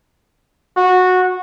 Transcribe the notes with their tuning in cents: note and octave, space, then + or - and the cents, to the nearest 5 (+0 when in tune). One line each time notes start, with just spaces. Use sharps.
F#4 -15